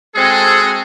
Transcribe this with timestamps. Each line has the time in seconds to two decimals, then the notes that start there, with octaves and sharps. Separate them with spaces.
0.15 G#3 C4 F#4 G#4 A4